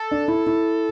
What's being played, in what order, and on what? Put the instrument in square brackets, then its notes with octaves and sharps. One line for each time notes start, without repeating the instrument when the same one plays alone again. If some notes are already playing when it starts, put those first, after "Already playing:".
Already playing: [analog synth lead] A4
[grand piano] D4
E4
E4